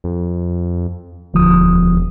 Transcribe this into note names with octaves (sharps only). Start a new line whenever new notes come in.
F2
E1 D2 F3 D#6